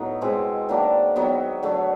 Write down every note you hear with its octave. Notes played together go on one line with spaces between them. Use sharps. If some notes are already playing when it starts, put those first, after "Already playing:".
Already playing: A2 F#3 B3 D#4
B2 G#3 C4 E4
D#3 F#3 A#3 D4
D#3 F#3 B3
D3 F#3 A3